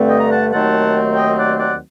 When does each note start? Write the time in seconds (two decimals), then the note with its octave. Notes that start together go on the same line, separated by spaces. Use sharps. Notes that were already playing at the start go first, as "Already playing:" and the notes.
Already playing: G2 D3 A3 C4
0.09 D#5 G5
0.20 A#5
0.30 F#5 A5
0.52 D#2 D#3 F#3 A3 C4 F#5 A5
1.16 D#5 G5
1.38 D5 F#5
1.59 D5 F#5